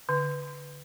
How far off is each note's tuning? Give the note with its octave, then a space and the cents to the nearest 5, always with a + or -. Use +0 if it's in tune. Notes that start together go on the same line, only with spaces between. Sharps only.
D3 -25